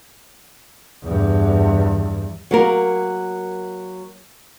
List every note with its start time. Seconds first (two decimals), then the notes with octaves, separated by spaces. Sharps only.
1.03 E2 G2
2.51 F#3 A#3 A#4